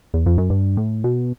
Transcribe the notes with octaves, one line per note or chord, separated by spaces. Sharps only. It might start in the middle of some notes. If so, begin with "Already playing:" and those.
E2
F2
F#2
G2
A2
B2